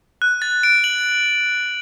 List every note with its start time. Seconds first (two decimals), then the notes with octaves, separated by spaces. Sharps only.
0.22 F#6
0.42 A6
0.63 D7
0.84 F#7